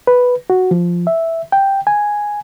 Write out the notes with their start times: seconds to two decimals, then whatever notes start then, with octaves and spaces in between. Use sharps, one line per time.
0.07 B4
0.50 F#4
0.71 F3
1.07 E5
1.52 G5
1.87 G#5